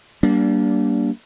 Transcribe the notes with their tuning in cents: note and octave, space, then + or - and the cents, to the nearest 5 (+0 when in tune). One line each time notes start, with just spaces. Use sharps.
G3 -30 A#3 +10 D4 -15